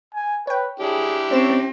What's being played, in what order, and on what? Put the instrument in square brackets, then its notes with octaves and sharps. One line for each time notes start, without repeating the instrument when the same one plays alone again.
[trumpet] G#5
[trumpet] B4 [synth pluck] C#5 G5
[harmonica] D4 E4 G4 [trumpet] G#4
[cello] C4 [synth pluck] C#4 C5 E7 [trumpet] C#5